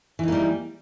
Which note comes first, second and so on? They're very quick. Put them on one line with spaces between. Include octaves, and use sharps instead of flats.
E3 D#4 A#3 G3